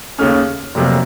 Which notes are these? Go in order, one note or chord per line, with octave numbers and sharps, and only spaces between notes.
D#2 C#3 A3 C#4 F6
F1 F2 C3 F#3 A#3